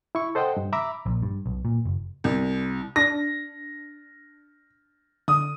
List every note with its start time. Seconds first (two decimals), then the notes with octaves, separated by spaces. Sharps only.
0.15 E4 C#6
0.35 A4 C5 D#5 F#5 G5
0.57 G2
0.73 E5 A#5 B5 D6 E6
1.06 A#1
1.22 G2
1.46 B1
1.65 A#2
1.85 F#1
2.24 C2
2.96 D4 A#6
5.28 D3 D#6